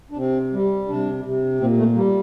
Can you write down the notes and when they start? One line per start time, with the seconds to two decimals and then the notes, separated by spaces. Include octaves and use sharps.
0.11 D4
0.16 C3 C4
0.53 G3
0.88 C3 D4
1.25 C3
1.60 A#2 C4
1.78 A3
1.96 G3 A#3